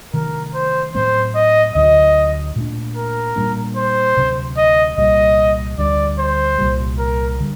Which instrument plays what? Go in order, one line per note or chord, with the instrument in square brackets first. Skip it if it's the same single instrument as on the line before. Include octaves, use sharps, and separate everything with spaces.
[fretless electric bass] C3 D#3 F#3 A3 [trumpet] A#4
[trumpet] C5
[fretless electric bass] A2 F#3 A3 C4 [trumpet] C5
[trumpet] D#5
[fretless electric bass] D2 D3 F#3 [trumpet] D#5
[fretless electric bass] A#2 A3 D4
[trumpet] A#4
[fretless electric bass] A#2 G3 A#3 D4
[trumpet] C5
[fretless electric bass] D2 C3 F#3 C4
[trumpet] D#5
[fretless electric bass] C2 A#2 G3 [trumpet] D#5
[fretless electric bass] D2 D3 G3 [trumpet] D5
[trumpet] C5
[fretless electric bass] C2 A#2 G3
[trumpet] A#4
[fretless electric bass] D3 G3